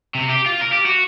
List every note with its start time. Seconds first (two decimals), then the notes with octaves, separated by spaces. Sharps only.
0.15 C3
0.30 G4
0.46 F4
0.61 A#4
0.73 G4
0.86 F#4